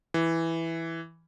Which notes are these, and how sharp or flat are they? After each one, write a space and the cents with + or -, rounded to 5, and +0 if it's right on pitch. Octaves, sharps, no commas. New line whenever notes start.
E3 +0